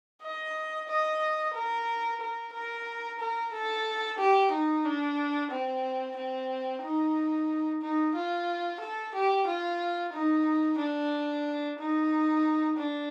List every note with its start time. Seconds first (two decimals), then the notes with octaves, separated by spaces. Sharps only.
0.22 D#5
0.88 D#5
1.54 A#4
2.21 A#4
2.53 A#4
3.19 A#4
3.52 A4
4.18 G4
4.52 D#4
4.85 D4
5.51 C4
6.16 C4
6.83 D#4
7.82 D#4
8.15 F4
8.81 A4
9.14 G4
9.47 F4
10.13 D#4
10.79 D4
11.79 D#4
12.77 D4